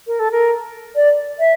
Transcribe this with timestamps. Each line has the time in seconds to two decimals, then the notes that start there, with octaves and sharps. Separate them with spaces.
0.07 A#4
0.20 A4
0.31 A#4
0.95 D5
1.39 E5